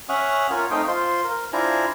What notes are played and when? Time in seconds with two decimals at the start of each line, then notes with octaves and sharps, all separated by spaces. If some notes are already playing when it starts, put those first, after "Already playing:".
0.09 C#4 E5 F#5 C#6 D#6 F6
0.51 F4 A#4 C#5 G#5
0.71 A3 C4 D#4 D#5 F5 G5
0.88 F4 C5 C6
1.24 A#4
1.53 D4 E4 F4 C5 G#5 A#5